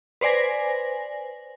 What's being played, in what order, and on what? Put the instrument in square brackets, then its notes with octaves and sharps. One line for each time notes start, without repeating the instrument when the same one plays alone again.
[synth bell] B4 C5 D5 G#5 A#6